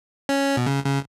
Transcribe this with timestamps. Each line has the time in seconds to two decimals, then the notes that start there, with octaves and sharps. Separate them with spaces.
0.29 C#4
0.57 B2
0.66 C#3
0.86 C#3